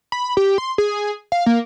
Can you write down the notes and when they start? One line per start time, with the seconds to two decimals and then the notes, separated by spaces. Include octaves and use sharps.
0.12 B5
0.37 G4
0.58 C6
0.78 G#4
1.32 F5
1.46 A#3